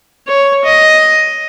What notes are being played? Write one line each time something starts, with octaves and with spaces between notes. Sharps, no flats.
C#5
D#5